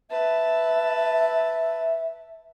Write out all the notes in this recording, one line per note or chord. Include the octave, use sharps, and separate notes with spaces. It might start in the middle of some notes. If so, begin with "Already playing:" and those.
B4 E5 A5